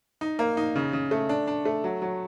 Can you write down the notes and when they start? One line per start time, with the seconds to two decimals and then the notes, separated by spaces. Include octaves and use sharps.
0.21 D#4
0.39 A#3
0.57 D#4
0.76 C#3
0.93 C#3
1.11 A3
1.29 D4
1.47 D4
1.65 A3
1.84 F#3
2.02 F#3